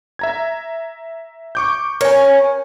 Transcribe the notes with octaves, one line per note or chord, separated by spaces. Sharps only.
E5 A#5 G#6
C#6 D6 G6
C#4 A#4 G#5